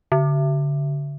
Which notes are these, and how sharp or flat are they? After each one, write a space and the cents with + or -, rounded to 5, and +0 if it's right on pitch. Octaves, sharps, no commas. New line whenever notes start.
D3 -35